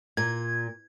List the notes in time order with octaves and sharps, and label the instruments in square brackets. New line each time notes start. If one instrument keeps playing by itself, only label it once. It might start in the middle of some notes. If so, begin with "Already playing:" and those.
[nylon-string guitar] A#2 [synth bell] G#6